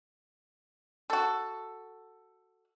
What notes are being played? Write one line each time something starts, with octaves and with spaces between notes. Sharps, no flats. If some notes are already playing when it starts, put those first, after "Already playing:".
F#4 A4